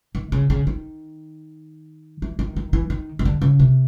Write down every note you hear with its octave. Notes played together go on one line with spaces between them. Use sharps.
D#3
C#3
C#3
D#3
E3
D#3
D#3
E3
D#3
D#3
D3
C#3
C3